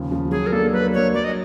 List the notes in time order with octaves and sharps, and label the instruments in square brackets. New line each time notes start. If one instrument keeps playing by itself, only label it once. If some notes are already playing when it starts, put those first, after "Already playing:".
Already playing: [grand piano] D#2 C#3 F3
C#3 F3
[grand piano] F#3 [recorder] G#4
[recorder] A#4
[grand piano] A#3 D4 [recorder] A4
[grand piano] F#3 [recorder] B4
[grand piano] A#3 D4 [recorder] C#5
[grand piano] F#3 [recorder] D5
[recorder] D#5